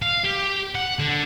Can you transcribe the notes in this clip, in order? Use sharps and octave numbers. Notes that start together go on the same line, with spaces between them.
F5
G4
F#5
D3